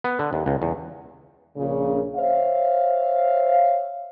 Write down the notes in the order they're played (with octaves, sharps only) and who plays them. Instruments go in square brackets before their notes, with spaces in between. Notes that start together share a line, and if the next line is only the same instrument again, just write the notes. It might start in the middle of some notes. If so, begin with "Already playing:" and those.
[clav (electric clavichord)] B3
D3
D#2
C#2
E2
[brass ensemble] A#1 A#2 C#3
C5 C#5 E5 F5